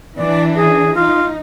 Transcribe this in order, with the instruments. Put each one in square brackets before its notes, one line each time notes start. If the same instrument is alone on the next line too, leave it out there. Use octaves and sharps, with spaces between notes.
[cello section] E3 D4 [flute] D5
[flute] G#4
[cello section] D#4 [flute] F4